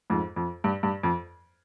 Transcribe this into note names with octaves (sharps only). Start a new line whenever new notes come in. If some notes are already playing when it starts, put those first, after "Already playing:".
F2 G#2
F2
G2
G2
F2